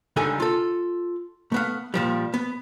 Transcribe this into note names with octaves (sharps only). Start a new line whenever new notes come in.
C#2 D3 G3 D#4 A4 G#5
F4 A4
A3 B3 F5
A#2 F3 G3
B3